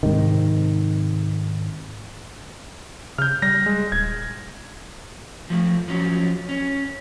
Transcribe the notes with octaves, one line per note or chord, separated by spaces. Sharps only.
G#2 C3 D#3
C#3 F6 G6
G3 A#6
G#3
D#1 G#6
F3 A3
F3 F#3 C#4
C#4